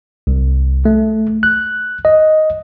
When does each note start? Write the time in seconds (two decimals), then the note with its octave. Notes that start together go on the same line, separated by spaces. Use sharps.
0.27 C2
0.85 A3
1.43 F#6
2.05 D#5